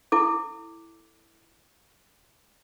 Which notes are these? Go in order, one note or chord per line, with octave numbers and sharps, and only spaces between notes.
E4 A4 D6